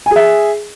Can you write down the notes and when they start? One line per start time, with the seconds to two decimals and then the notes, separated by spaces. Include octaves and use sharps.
0.06 G#5
0.11 G#4
0.16 E5